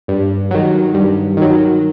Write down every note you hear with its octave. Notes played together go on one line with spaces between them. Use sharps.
G2
D#3 F#3
G2
D#3 F#3